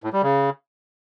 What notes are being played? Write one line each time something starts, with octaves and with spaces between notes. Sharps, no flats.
A2
G3
C#3